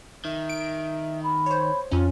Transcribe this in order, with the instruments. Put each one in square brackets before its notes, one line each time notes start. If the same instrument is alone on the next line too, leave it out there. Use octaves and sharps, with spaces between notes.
[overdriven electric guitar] D#3 [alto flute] E5
[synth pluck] D7
[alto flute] B5
[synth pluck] C5 C#5
[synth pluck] F2 C#4 [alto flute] F4